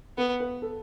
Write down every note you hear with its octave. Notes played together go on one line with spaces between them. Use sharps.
B3 B4
B4
A4